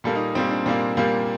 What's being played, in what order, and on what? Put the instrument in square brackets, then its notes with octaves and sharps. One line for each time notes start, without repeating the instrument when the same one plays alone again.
[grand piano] A#2 G3 A#3 A4
D#4
A#2 G3 A#3 C4
D4
A#2 G3 A#3 C4
A#2 G3 A#3